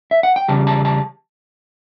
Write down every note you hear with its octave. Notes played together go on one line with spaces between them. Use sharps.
E5
F#5
G5
E2 C#3 G3 A5
A5
A5